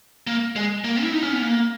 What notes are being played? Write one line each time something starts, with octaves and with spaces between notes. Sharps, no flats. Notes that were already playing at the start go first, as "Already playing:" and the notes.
A#3
G#3
A#3
E4
D#4
C#4
B3
A#3